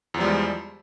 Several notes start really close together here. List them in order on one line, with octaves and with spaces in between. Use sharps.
E2 F3 G3 G#3